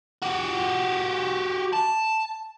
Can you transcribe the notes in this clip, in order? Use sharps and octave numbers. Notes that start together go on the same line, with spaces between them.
F#4 G4
A5